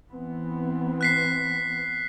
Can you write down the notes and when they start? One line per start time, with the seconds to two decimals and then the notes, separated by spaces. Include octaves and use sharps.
0.11 E3 B3 C4
1.01 F#6 B6 C7